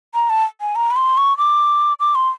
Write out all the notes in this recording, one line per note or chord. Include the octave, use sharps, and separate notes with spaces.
A#5
A5
G#5
A#5
B5
C6
C#6
D6
D6
C6